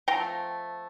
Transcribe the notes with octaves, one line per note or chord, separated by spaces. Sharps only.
F3 A3 C4 G5 A#5